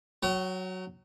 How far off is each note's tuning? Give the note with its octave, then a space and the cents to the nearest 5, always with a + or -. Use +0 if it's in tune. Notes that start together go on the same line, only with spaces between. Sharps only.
F#3 +0 F#5 +45